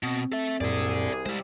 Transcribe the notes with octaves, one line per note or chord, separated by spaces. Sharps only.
B2 C4
A4 E5
C2 F#2 A#2 G#4 A4 D5
G3 G#3 C5